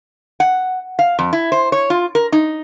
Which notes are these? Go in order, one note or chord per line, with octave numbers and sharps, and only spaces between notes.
F#5
F5
F2
E4
C5
C#5
F4
A#4
D#4